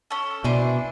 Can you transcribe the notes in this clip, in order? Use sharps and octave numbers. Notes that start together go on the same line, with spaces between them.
C#4 A4
B2 D4 E4 C5 G#5 D6